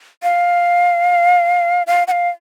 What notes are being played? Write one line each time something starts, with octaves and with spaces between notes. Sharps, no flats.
F5
F5
F#5
F5